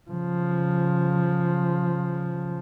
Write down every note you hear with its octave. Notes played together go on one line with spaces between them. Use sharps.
C#3 F3